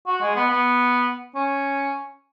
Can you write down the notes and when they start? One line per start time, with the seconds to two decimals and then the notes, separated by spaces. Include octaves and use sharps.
0.07 F#4
0.21 G#3
0.36 B3
0.50 B3
1.35 C#4